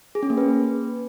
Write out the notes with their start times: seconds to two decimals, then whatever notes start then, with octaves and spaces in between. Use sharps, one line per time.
0.15 G#4
0.23 C#4
0.30 A#3
0.37 B4